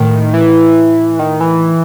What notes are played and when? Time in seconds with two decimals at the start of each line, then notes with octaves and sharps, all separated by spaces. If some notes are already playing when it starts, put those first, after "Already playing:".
Already playing: A2 D#3
0.34 E3
1.19 D#3
1.41 E3